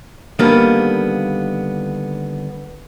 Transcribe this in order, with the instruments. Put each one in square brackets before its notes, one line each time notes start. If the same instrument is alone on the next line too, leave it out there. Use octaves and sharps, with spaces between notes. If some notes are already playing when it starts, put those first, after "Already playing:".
[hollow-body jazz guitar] D3 D#3 G3 A#3 B3 D4